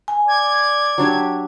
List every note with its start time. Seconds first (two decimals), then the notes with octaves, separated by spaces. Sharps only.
0.08 G#5
0.28 D5 G#6
0.98 F#3 D4 G4